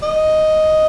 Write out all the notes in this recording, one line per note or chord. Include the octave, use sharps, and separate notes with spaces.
D#5